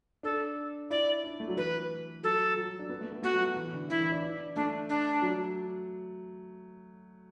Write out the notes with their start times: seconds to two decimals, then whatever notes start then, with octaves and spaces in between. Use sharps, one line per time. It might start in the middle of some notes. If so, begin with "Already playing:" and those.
0.23 D4 A4
0.90 E4 D5
1.24 D4
1.40 A3
1.48 F#3
1.56 E3 B4
2.23 F#3 A4
2.57 F#3
2.79 D4
2.89 B3
3.01 A3
3.12 B3
3.22 A3 F#4
3.34 F#3
3.44 F#3
3.56 E3
3.73 D3
3.89 E3 E4
4.00 E3
4.12 D4
4.22 D4
4.56 A3 D4
4.89 D4
5.22 F#3